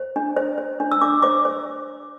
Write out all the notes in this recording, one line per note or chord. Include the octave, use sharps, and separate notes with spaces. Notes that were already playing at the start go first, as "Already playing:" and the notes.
Already playing: C5
D4
C5
C5
D4
E6
D4 D6
C5 D6
C5